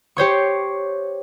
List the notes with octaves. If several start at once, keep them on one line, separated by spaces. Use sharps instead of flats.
G4 C5 C#5 C#6